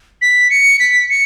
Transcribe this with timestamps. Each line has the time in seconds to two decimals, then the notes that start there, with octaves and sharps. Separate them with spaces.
0.22 B6
0.50 C#7
0.80 B6
1.10 C#7